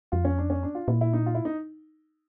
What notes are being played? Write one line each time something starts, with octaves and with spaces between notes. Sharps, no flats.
F2 F4
C#4
D4
C#4
D4
F4
A#2 E4
E4
D#4
F4
E4
D#4